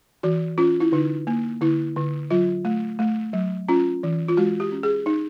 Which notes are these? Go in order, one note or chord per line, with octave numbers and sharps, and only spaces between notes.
E3 F#4
C#4 F4
E4
D3 D#4
A#3
D3 E4
D3
F#3 F4
A3
A3
F#3
C#4 F4
E3
F4
G#3 F#4
G4
C#4
G#4
D#4